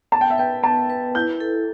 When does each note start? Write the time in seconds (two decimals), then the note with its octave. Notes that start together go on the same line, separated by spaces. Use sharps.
0.12 B3 A5
0.21 G5
0.30 E5
0.38 B4 G5
0.63 B3 A5
0.90 B4
1.15 E4 G6
1.40 A4